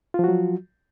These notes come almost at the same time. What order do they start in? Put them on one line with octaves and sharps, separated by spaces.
F4 F3 F#4 F#3